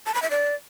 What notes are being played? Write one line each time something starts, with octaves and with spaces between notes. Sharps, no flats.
A5
B5
E5
D5